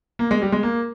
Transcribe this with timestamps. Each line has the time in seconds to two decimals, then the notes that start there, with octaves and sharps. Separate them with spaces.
0.19 A#3
0.31 G#3
0.42 G3
0.52 G#3
0.63 A#3